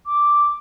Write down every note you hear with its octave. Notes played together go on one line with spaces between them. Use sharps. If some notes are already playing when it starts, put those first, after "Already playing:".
D6